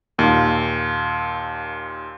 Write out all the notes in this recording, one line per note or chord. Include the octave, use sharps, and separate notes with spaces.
D#2 A#2